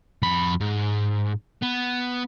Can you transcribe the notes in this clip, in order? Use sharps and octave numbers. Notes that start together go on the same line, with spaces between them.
F2 B5
G#2
B3